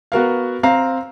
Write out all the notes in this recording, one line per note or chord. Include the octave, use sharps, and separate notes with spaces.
B3 F#4 A#4 F5
C4 F5 A#5